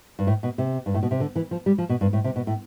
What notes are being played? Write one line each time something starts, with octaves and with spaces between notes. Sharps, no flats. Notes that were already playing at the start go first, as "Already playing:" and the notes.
G2
A2
B2
C3
G2
A2
B2
C3
D3
E3
F3
G3
F3
B2
G2
A2
C3
B2
A2